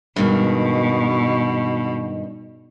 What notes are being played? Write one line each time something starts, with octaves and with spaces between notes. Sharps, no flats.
G2 B2 D#3 G#3